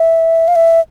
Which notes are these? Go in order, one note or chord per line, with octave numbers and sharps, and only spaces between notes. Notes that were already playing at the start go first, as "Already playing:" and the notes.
Already playing: E5
F5
E5